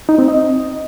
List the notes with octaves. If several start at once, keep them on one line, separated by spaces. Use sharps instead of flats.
D#4
C4
D#5